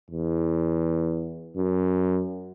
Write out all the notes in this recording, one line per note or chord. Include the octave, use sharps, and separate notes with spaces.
E2
F#2